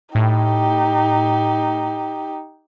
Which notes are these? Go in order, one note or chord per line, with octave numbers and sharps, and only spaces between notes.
A2 D#4 G4